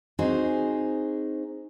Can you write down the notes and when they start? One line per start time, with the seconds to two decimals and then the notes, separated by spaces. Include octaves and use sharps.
0.19 C4 D#4 F#4 G#4 C5